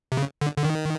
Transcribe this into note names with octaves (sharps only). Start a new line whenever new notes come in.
C3
C#3
D3
D3
D#3